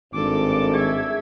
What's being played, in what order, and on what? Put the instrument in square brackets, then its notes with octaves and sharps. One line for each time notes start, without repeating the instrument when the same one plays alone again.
[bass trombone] G#1 [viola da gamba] G2 A4 [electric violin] D6
[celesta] G#4 [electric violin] E5 G#6